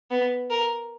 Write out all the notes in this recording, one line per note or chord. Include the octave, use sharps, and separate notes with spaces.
B3
A#4